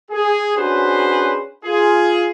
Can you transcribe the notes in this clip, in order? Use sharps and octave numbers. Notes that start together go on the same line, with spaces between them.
G#4
C#4 D4 F#4 G#4 B4 C5
F4 G#4